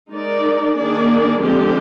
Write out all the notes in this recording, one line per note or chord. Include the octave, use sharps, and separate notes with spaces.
G#3 D#4 A#4 D5
D#3 A#3 D4 G#4 D5
D3 F3 G#3 C4 G4